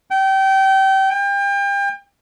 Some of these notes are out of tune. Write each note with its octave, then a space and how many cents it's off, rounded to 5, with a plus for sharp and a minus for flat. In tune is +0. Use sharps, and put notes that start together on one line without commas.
G5 -25
G5 +35